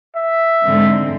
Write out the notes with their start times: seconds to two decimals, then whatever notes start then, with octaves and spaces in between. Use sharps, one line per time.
0.16 E5
0.63 G#2 D3 C4